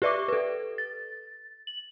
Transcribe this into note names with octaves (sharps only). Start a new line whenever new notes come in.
G4 B4 D5 E5 C#6 D6
A4 B4
A6
F#7